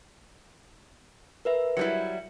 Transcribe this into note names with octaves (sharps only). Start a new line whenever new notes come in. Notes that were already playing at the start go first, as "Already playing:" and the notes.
A#4 B4 E5
F#3 G3 E4 C#7